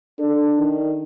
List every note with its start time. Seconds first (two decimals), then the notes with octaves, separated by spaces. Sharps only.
0.19 D4 A4
0.58 D#3